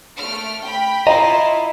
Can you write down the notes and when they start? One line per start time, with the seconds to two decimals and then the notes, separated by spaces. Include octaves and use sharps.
0.16 A3 F6 D7
0.61 G5 B5
1.07 E4 F4 D#5 A#5